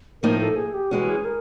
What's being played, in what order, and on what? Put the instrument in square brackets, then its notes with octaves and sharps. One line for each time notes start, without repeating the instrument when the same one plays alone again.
[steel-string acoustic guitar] A2 F3 A#3 D#4 [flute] A#4
[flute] A4
G#4
G4
[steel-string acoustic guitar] E3 G#3 C#4 [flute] F#4
[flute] G#4
A#4